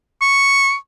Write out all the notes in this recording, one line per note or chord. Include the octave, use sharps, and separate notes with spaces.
C#6